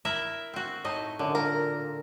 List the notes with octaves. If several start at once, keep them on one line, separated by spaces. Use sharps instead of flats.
E4 A#4 E5
C4 F#4
A2 D#4 D#5
F#2 D3
A#2 A#4